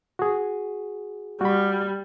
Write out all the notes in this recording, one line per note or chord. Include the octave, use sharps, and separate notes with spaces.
F#4 G#4
G3 F#4 B5